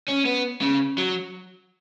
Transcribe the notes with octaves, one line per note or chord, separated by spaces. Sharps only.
C#4
B3
C#3
F#3